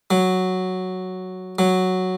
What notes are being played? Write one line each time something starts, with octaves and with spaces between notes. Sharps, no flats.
F#3
F#3